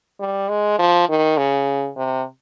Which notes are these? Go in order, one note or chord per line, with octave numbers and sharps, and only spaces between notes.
G3
G#3
F3
D#3
C#3
C3